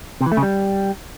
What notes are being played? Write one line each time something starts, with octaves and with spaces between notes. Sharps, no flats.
C3
E3
A3
C#3
G3